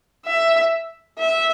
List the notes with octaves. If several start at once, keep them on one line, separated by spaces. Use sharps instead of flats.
E5
E5